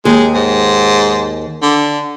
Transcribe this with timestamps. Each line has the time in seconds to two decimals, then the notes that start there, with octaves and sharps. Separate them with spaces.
0.05 D#2 G#3
0.34 G#2
1.62 D3